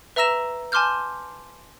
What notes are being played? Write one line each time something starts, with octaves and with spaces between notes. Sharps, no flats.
B4 E5 A#5 E6 A#6 E7
G#5 A5 C6 D6 F6 G6